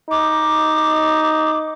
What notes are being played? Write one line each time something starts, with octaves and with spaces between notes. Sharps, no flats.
D#4 D6